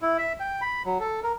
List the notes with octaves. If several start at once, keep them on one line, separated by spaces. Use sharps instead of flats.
E4
E5
G5
B5
F#3
A4
A#4